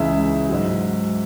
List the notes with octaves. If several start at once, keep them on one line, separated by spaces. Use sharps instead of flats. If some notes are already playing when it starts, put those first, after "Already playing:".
Already playing: C#2 C#3 E3 E5
G#2 F#3